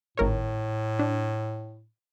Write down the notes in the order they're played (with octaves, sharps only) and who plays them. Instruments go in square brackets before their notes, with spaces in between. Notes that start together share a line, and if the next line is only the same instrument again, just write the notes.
[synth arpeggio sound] G#1 A#4 C#5 [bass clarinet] A2
[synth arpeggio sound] D4